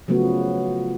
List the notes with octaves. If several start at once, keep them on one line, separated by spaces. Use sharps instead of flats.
C#3 F3 F#3 A3 B3 F#4